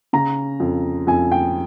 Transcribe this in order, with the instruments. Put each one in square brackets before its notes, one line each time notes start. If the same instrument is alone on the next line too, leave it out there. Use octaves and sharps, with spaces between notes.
[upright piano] C#3 A#5
F2
F2 G#5
G5